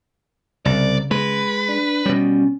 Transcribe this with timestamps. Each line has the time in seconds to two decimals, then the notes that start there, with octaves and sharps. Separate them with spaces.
0.65 C2 C#3 D5
1.11 G#3 B4
1.68 D4
2.06 B2 G3 C#4